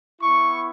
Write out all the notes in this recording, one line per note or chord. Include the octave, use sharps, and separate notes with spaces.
B3 E4 C#6